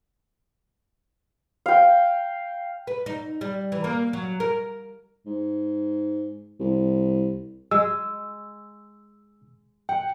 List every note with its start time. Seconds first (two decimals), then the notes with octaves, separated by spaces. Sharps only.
1.66 F5 G5
2.87 B4
3.06 D#4
3.41 G3
3.72 E3
3.84 A#3
4.13 F#3
4.40 A#4
5.26 G#2
6.60 C2
7.71 G#3 E6
9.89 F#5 G5